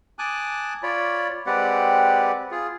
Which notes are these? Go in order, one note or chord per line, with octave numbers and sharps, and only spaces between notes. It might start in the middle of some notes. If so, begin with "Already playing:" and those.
G#5 A5 D6 D#6 F#6
F4 C#5 D5 B5
G#3 C4 G4 B4 D5 F#5
F4 G#4